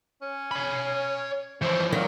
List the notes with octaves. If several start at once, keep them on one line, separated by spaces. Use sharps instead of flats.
C#4
C#5 B5
E3 F3 C4 C5 C#5
A#2 D#3 F#3